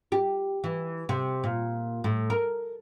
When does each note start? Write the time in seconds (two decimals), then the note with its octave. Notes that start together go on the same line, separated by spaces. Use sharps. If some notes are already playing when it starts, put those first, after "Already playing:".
0.12 G4
0.64 E3
1.09 C3
1.44 A#2
2.04 A2
2.30 A#4